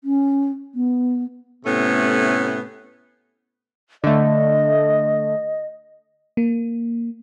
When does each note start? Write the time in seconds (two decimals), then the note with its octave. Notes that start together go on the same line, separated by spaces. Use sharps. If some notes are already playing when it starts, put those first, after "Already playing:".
0.04 C#4
0.75 B3
1.66 A2 C3 A3 B3 C#4
4.04 D3 A3 D#5
6.37 A#3